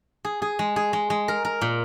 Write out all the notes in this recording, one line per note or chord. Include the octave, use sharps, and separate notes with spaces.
G#4
G#4
G#3
G#4
G#3
G#3
A#4
A#4
A#2